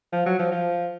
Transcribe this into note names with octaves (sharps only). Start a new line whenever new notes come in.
F3
F#3
F3
F3